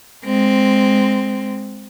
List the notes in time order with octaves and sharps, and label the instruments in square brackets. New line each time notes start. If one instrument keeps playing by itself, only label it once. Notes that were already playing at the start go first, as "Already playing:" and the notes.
[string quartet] G#3 C4